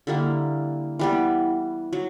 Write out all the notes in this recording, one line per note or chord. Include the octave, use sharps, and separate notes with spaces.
D3 G3 A#3 E4
E3 G3 B3
F#3